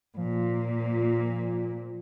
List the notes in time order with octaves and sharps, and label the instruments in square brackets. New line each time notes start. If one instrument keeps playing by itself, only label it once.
[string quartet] A#2 [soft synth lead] F3